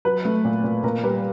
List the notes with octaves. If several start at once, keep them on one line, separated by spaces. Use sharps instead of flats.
F#3 B4
A3
A#2
A#2
A#2 A#4
G3 B4